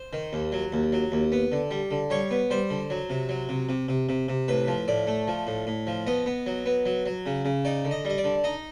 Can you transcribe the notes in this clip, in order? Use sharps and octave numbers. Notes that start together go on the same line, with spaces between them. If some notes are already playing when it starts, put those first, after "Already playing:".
Already playing: C5
D#3
D#2
F#3
D#2
F#3
D#2
B3
D3
G3
D3
G3 C#5
B3
G3 C5
D3
F#3
C3
F#3
C3
C3
C3
C3
C3
A2 B4
F3
A2 D5
A3
F3
A2
A2
F3
B3 D#5
B3
F#3
B3
F#3
F#3
C#3
C#3
D#4 D5
D3
D#5
G3 D#5
D5
D3
D#4 D#5